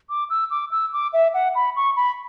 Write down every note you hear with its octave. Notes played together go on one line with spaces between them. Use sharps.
D6
E6
D6
E6
D6
E5
F#5
B5
C#6
B5